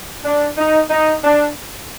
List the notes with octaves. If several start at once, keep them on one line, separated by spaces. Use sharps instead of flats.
D4
D#4
D#4
D4